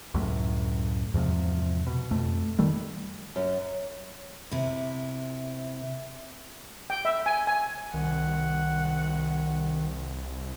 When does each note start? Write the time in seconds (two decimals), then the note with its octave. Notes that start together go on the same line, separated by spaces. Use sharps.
0.14 C#2 F#2 A2
1.14 E2 G#2 C3 F3
1.87 B2
2.11 F2 A3
2.59 D#3 G3 A3
3.36 F#2
4.51 C3 E4
6.90 G5
7.05 E5
7.26 G#5
7.47 G#5
7.94 C2 D#3 F#5